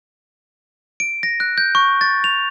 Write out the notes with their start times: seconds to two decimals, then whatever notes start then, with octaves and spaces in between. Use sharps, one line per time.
1.00 D7
1.23 A#6
1.40 F#6
1.58 G6
1.75 C#6
2.01 A6
2.24 F7